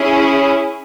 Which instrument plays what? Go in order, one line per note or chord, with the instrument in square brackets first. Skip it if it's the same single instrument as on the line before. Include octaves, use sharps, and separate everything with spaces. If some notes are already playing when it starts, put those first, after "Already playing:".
Already playing: [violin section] C#4 E4 G#4